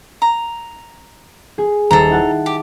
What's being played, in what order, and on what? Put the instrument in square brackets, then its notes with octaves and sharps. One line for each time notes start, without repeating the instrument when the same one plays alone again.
[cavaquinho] A#5
[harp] G#4
[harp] D#1 C7 [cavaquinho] A4 A#5
[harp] E4 F#5 A5
[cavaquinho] G4